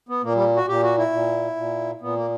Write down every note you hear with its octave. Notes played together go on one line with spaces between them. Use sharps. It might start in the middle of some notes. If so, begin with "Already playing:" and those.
B3
A#2 A#3
G3
F#4
A#2 G4
F#4
E4
A#2
A#2
A#2 B3
A#3